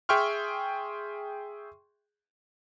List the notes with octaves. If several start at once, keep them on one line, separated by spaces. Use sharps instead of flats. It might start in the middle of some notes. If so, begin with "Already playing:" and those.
G#4 E5 G5 C6 C#6 F6